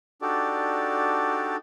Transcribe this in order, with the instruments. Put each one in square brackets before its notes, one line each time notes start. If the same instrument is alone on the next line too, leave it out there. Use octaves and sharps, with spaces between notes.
[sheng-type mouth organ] D4 D#4 F#4 G4 A4 D5